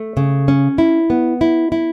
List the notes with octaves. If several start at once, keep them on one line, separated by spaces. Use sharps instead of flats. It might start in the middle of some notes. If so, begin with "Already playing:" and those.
Already playing: A3
C#3
C#4
E4
B3
E4
E4